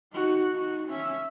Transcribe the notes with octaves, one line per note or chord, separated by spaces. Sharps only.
D#4 F#4
D#4 F#4
C#4 E5